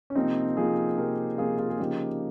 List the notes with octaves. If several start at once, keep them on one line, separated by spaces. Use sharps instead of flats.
C#4
C3 F3 A#3 C4 D#4
C3 F3 A#3 F4 G#4
C3 F3 A#3 G4 A#4
C3 F3 A#3 F4 G#4
F4 G#4
G#4
C#3 F3 A#3 D#4 G4